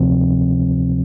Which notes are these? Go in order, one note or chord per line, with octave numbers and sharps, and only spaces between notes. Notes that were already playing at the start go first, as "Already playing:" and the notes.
Already playing: D2 C3 F3 C4